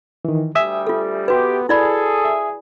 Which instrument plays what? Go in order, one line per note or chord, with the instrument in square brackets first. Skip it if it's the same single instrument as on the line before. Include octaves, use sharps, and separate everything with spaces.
[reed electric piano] D#3 E3
[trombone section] D2 G3 [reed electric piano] E5 G#5 D#6
[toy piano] F4 A4
[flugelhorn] B3 [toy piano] F#4 B4 [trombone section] G4
[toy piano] E4 D5 B5 [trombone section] G#4 [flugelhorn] A4
[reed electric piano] E5